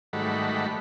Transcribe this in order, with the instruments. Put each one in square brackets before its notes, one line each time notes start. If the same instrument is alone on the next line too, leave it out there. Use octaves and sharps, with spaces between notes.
[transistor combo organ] G#2 D#3 G3 A3 F#4 B5